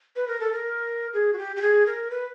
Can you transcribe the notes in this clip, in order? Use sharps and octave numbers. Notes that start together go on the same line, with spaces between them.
B4
A#4
A4
A#4
G#4
F#4
G4
G4
G#4
A#4
B4